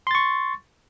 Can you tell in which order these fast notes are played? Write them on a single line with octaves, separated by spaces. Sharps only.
C6 A6 C#6